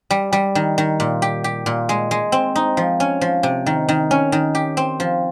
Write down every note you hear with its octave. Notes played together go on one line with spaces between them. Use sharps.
G3
G3
D#3
D#3
A#2
G4
G4
A#2
G#3
G#3
C4
D#4
F3
C#4
F3
C3
D#3
D#3
C#4
D#3
G4
C4
F3